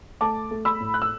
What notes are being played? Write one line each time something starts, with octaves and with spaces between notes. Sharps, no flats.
A3 A5 D6
A3
B5 E6
A2
F#6
E6